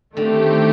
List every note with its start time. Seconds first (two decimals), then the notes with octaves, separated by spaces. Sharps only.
0.16 D3 D#3 A3 C4 G4